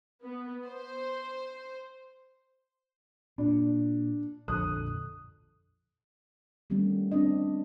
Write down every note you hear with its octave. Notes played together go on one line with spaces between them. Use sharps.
B3
C5
A#2 D4
A#1 F2 D3 A4 D#6 F#6
D#3 G3 A3 B3 C#4
C4 D4 D#5